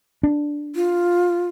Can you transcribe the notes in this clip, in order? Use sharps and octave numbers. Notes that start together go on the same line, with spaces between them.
D4
F4